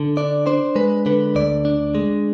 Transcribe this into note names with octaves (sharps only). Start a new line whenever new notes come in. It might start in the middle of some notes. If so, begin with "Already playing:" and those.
Already playing: D3
D4 D5
D4 C5
G#3 B4
D3 B4
D2 D5
D4
G#3